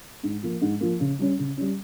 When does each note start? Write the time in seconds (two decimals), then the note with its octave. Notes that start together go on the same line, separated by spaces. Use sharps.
0.23 G#2
0.43 F3 A#3
0.61 G#2
0.80 F3 A#3
1.00 C#3
1.19 G3 C#4
1.39 C#3
1.57 G3 C#4